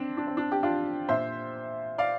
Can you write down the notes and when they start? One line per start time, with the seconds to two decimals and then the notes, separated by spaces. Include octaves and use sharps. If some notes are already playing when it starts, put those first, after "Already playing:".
Already playing: C4 D4
0.17 D4
0.27 C4
0.37 D4
0.52 G4
0.63 D4 F4
1.09 A#2 C5 E5
1.98 D5 F5